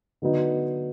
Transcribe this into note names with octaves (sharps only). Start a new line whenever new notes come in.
D3 F#3 B3 D#4